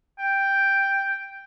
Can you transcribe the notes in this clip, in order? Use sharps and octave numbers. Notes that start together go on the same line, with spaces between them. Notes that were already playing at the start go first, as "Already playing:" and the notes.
G5